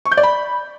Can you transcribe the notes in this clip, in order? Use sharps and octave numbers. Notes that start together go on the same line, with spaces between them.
C#6
G6
D5
B5